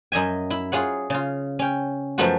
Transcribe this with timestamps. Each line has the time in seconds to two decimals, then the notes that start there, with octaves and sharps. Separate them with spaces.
0.12 F#2 D#5 E5 G#5
0.50 E4
0.72 F4 G#4 C#5 F#5
1.10 C#3 F4
1.59 C#4 G5
2.18 F#2 F3 A3 B3 F4 F#4